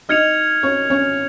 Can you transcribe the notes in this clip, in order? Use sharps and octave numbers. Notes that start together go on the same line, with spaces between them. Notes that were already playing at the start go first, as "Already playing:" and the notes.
D#4 D#5 F6 G#6 C#7 F7
C#4 C#5
C#4 C#5